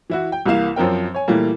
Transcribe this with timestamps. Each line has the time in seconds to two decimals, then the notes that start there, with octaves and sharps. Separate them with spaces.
0.10 E3 E4 F#4
0.32 G5
0.46 C2 E3 A#3 F5 E7
0.76 F#2 F3 C4 A#4 G5
1.15 C#5 G#5
1.28 A#2 E3 G3 A3 A#3